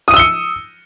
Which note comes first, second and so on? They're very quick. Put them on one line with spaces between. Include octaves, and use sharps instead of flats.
D#6 D#7 E6 G7 C#7